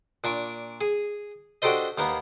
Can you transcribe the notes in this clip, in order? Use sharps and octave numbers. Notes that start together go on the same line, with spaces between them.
A#2 D4 C#6
G#4
D4 F#4 G4 A4 C5 D#5
D#2 A#3 B3